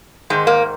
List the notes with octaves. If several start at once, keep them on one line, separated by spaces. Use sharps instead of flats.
G#2 D#3 G#3
A#3